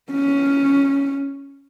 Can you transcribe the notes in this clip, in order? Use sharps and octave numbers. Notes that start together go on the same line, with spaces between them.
C#4